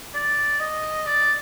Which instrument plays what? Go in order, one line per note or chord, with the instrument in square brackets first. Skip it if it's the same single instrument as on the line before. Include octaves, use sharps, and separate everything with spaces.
[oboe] D5
D#5
D5